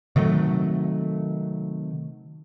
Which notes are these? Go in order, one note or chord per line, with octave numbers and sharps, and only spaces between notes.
C3 D#3 F#3 A3